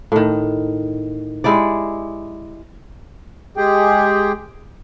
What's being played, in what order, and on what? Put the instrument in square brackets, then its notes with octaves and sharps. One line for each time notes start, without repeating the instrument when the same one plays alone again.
[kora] A2 D#3
G#3 E4 G4 D5
[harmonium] G#3 G4 G#4 G5